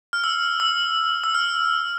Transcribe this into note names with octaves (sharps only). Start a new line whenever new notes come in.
F6
E6
E6
E6
F6